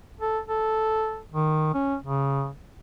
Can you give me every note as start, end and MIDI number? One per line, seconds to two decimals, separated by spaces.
0.21 0.39 69
0.48 1.20 69
1.32 1.70 51
1.74 1.96 61
2.02 2.49 49